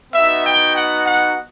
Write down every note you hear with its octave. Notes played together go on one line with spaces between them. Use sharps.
B3 D#4 F#4 E5
G5
F#5
F#5